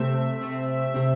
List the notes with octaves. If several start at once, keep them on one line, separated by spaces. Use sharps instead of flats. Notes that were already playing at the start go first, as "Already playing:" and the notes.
Already playing: C3 A3 C4 E5
C3 A3 C4
C3 A3 C4